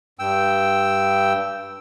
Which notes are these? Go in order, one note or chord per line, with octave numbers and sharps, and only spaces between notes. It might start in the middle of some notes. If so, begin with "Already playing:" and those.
G2 G5 E6